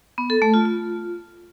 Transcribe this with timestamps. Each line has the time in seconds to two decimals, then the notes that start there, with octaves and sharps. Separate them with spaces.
0.18 B3
0.30 A4
0.42 A3
0.54 F4
0.66 F4